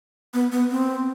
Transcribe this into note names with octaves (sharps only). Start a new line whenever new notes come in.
B3
B3
C4